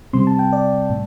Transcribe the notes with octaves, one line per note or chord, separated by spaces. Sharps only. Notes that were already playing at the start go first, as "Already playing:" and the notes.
C3 G3 C4 C6
A5
G5
D5
A2